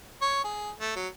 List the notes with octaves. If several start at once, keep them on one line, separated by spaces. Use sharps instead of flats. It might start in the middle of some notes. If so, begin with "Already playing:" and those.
C#5
G#4
A3
F#3